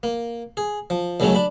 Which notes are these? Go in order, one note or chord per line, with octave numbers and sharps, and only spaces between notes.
A#3
G#4
F3
D#2 C#3 F#3 G#3 A3 C#4
D4 B5